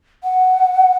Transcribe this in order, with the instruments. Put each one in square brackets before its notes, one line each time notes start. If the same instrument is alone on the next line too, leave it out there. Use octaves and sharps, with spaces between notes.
[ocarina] F#5